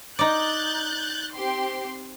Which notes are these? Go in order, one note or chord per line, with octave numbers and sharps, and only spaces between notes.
D#4 D5 F#6 G6 A6
C4 G4 C6